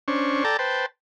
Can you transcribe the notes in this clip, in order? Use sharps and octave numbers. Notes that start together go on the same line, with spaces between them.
C#4 D4 C5 C#6
A4 D5 G5 A5 A#5
B4 C5 G5 A5